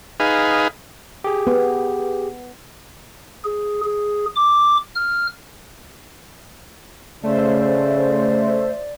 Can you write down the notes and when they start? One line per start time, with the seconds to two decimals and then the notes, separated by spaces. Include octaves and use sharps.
0.20 D#4 G#4 B4 F5
1.24 G4 G#4
1.47 B3
3.45 G#4
3.84 G#4
4.36 D6
4.96 F6
7.24 C#3 A3 C5 D5 E5